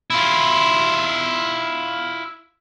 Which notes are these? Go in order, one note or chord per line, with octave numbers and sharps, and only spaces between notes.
E4 F4